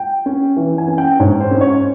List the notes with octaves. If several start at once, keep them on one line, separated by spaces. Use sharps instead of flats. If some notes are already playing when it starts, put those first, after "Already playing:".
Already playing: G5
C#4
E3
G#5
C#4
G5
G#2 C#5
C5
C#4
C#5